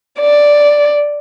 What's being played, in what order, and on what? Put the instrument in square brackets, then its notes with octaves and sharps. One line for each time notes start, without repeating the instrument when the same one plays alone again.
[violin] D5